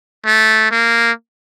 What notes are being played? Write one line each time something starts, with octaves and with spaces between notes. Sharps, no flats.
A3
A#3